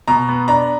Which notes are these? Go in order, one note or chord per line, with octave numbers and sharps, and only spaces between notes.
B2 A#5
B3
D4 A#5